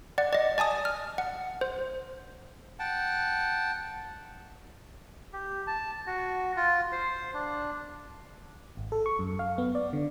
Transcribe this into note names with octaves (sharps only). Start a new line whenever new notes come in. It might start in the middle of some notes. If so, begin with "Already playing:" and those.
D5 F#5
D5 D#5
D5 G#5 A5 D#6
F6
F#5
C5
F#5 G5 A5
G4
A5
F#4
F4
C5
D4
G#1
A4
C#6
F#2
F5
B3
D5
D3